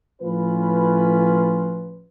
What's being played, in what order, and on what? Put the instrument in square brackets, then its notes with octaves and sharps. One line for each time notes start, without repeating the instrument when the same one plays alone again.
[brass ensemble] A2 F3 C#4 F4 B4